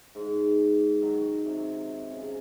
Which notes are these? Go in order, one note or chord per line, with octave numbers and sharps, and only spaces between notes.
G#2
D#3 F#3
C3
C#3
C3